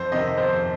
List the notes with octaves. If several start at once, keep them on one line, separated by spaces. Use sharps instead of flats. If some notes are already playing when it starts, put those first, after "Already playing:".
Already playing: F2 C5
C3 D#3 D#5
F2 C5